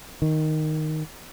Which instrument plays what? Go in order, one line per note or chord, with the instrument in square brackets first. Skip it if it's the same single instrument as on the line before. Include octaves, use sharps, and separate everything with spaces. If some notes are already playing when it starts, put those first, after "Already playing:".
[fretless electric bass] D#3